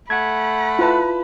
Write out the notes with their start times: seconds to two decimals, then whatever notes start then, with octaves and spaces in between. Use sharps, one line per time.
0.10 A3 F#5 B5 G#6
0.79 E4 F4 B4 A5